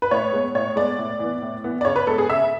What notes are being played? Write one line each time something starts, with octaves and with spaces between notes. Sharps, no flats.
B4
A2 C#5
G#3 B3
A2 C#5
G#3 B3 D5
A2
E3 B3
A2
E3 B3
D5
C#3 C#5
B4
G#3 B3 A4
G#4
C#3 E5